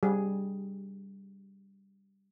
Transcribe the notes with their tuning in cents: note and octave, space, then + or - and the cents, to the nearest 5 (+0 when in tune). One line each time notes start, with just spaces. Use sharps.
G3 +0 G#4 +5